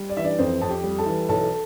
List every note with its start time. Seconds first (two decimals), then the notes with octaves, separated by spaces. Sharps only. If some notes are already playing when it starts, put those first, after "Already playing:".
Already playing: G3
0.10 D5
0.17 E3 E5
0.24 D4 D5
0.39 F2 C4 C5
0.61 F2 A5
0.69 G4 G5
0.84 G3
0.98 A4 A5
1.06 E3
1.29 B1 A4 A5